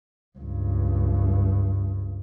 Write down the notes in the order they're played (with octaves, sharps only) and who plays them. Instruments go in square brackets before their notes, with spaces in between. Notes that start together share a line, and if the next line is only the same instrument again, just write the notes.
[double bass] C#2 G2